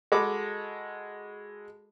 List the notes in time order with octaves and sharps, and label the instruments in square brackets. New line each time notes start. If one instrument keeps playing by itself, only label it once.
[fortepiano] G#3 F#4 A4 B5 D6